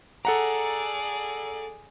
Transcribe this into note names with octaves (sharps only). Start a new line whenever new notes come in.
G#4 A4 D5 F#5 A#5